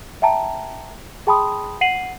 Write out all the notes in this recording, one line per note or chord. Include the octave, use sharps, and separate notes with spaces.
E5 G5 A5 A#5
G#4 G5 A5 B5 C6 D#6
F#5 C7 D#7 F#7